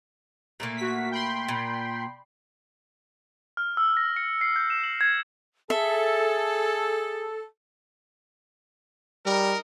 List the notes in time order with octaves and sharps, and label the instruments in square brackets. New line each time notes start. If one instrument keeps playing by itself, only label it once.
[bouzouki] A#2 A3 A#3
[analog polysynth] F#4 B6
G5 B5 C6
[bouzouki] A#2
[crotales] F6
E6
A#6
C#7
C7
G6
E7
F#7
G#6
[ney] G#4 [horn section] A4 [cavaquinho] E5
[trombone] G3 [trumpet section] D#4 A#4